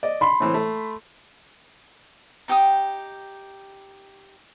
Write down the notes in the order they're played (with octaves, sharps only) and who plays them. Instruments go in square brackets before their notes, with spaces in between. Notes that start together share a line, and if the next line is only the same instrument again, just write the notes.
[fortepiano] D5 D#5
[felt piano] B5 C6
[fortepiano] A2 E3 C4
A3
[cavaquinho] D#4 G4 G5 D#6